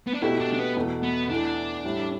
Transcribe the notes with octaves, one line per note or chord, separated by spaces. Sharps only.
B3
D4
B2 A3 E4 G4
D4
D4
B3
E2 B2 A3
B3
E2 E3 A3 D4
A2 G3 E4